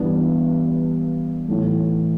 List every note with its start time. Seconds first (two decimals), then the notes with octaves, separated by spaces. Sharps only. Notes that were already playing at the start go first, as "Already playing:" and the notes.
Already playing: G2 E3 B3 D4
1.48 A2 E3 A3